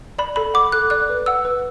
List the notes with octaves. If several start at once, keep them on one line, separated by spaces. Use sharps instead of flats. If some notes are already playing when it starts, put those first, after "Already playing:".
D5 B5
A4 B5
F#5 D6
A4 F#6
D5 F#6
B4
F#5 E6
B4